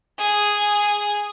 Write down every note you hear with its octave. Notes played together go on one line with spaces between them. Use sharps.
G#4